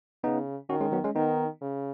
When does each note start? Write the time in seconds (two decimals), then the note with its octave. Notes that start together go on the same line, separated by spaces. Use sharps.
0.24 C#3 B3 D#4
0.70 D#3 C#4 F#4
0.81 G#3 C#4
0.92 F#3 B3
1.04 G#3 C#4
1.15 D#3 B3 D#4
1.61 C#3